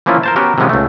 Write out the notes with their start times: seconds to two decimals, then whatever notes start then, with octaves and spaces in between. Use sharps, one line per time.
0.06 E3 F3 A#3 C#4 E4 F4
0.23 A#4 C5 A5
0.36 B3 C#4 F#4 G4 A#4
0.58 C3 D#3 F3 G#3 B3 C#4
0.69 C#2 A3